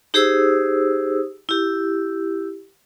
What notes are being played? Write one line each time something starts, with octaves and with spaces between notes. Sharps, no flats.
D#4 G4 G#4 C5 D#6 E6
E4 G4